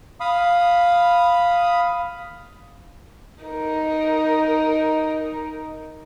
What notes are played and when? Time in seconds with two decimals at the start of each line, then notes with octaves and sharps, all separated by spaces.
0.20 F5 B5 D#6
3.44 D#4 A#4